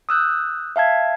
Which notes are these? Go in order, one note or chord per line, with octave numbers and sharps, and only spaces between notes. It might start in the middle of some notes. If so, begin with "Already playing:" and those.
D#6 E6 F#6 G6
E5 F5 A5 G#6